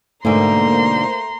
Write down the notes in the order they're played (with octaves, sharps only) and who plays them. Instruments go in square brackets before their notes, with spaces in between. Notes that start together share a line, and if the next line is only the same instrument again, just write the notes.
[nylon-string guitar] G#2 B2 D3 [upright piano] A3 [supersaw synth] A#3 C5 [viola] A#5 C6